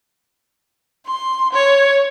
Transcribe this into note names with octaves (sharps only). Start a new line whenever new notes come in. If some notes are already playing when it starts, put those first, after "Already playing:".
C6
C#5